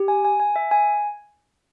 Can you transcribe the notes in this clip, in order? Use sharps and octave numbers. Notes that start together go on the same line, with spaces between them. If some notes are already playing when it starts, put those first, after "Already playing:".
Already playing: G4
G#5
G#5
G#5
E5
G#5